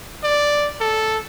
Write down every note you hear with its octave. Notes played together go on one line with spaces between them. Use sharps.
D5
A4